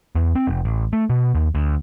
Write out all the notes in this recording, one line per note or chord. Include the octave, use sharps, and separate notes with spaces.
E2
C4
F1
A1
A3
B2
D#2
D2